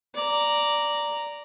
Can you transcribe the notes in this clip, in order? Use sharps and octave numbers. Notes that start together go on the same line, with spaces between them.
D5 A#5